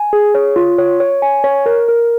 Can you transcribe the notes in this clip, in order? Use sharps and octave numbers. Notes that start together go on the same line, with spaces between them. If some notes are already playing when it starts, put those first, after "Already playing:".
Already playing: G#5
G#4
C#5
F4
C#5
C#5
G#5
C#5
A#4
A#4